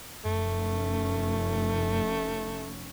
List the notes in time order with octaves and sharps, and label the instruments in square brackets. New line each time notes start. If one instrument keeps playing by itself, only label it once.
[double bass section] F1 C#4 [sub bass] F#2 [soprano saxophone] A3